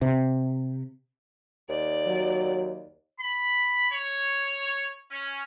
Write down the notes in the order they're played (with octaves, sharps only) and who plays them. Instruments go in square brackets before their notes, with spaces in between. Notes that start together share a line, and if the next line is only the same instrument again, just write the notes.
[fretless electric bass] C3
[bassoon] D#2 [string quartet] D5
[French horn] F#3
[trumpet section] B5
C#5
C#4